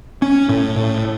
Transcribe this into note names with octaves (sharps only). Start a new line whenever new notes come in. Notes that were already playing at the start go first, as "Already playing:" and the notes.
C#4
A2
A2